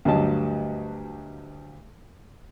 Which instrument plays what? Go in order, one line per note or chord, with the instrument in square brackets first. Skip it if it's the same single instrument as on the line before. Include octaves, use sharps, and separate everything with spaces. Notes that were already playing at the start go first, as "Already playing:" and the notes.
[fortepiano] D2 G2 F#3 D#5 A5